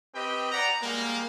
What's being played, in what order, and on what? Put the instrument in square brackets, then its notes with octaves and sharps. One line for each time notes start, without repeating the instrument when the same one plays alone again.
[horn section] C4 G4 B4 D#5 G5
D5 F#5 A#5
G3 G#3 A#3